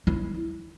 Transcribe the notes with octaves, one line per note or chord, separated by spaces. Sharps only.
E4